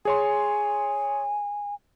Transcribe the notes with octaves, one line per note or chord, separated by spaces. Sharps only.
G#4 C#5 G#5 C6